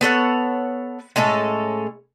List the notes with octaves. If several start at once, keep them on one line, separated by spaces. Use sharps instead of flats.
B3 A4 C#5 F#5
A2 G#3 C#4 A4